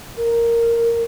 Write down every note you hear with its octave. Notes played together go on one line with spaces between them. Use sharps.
A#4